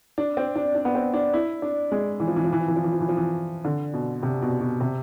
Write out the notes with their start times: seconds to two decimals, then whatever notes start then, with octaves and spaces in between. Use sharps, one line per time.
0.18 D4
0.37 C4
0.55 D4
0.75 D4
0.85 B3
0.95 C4
1.14 D4
1.34 E4
1.62 D4
1.92 G#3
2.20 E3
2.27 F3
2.36 E3
2.44 F3
2.53 E3
2.60 F3
2.68 E3
2.76 F3
2.84 E3
2.93 F3
3.00 E3
3.09 F3
3.17 E3
3.65 D3
3.94 B2
4.23 C3
4.42 B2
4.61 B2
4.81 C3